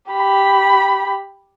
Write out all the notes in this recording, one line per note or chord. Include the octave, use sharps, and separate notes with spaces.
G4 B5